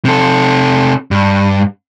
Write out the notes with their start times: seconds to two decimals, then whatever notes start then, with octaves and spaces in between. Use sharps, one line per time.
0.05 C3 A4
1.11 G2